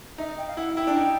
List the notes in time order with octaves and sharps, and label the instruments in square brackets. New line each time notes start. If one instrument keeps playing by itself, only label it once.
[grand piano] D#4 [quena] E5
[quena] D#5
G5
F5
[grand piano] E4 [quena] F#5
[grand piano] E4 [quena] G5
[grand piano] D4
D#4